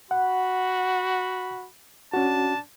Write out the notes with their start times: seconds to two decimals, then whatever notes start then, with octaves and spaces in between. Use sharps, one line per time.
0.11 F#4 F#5 B5
2.14 C#4 D4 F#4 A5